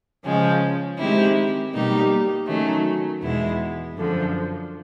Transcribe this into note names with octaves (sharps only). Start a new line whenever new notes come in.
C#3 F3 G#3 C#4
D#3 G#3 C4 E4 G4
B2 G3 A#3 D#4 G4
D#3 F#3 A3 C#4
E2 B2 G#3 B3 E4
F#2 D3 F3